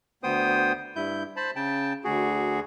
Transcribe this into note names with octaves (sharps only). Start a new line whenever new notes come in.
D2 B3 C5 G5 D#6
G2 E4 G6
C5 A5 B5
C#3 G5 A5
D2 F#4 G#4